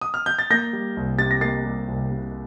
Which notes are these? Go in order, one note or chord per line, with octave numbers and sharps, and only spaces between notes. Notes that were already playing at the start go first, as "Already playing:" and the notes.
D#6
F6
G6
A6
A#3 G6 A#6
G3
C2
C3 A6
A#6
A#3 A6 C7
G3
C2
C3